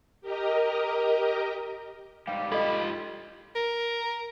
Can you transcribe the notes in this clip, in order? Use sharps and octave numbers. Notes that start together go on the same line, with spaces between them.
G4 A#4 D#5 A#5
G#2 G3 G4 F5
F4 A4 D#5 B5
A#4